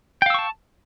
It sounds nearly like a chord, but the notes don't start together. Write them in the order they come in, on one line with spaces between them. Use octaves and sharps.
G5 F5 E6 C#6 A5